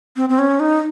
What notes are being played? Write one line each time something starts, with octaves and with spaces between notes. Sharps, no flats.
C4
C4
C#4
D#4